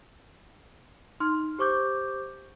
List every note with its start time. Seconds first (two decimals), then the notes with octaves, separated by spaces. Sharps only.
1.20 D#4 C6 F6
1.59 G4 C5 C#6 D6 G6